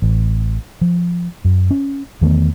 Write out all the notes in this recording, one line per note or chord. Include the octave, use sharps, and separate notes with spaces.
A1
F3
F#2
C#4
E2 D#3 A3 B3